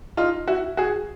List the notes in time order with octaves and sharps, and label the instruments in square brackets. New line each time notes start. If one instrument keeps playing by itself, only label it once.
[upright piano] D#4 F4
E4 F#4
F#4 G#4